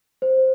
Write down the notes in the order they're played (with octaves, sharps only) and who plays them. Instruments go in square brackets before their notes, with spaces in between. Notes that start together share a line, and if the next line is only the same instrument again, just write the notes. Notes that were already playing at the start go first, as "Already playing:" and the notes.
[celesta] C5